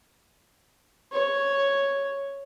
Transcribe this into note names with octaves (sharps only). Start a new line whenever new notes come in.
C#5